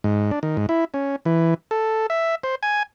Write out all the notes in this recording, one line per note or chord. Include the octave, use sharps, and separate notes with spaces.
G#2
D4
D#3
G#2
E4
C#4
E3
A4
E5
C5
G#5